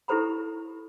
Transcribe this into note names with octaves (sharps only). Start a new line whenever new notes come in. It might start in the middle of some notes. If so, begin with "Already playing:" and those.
E4 G4 A4 C5 A#5 B5